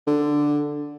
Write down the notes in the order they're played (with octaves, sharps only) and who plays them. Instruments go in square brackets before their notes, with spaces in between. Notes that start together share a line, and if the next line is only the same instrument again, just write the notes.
[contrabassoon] D3